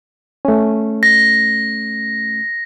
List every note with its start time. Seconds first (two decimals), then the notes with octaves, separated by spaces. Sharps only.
0.45 A3 C#4
1.03 A#6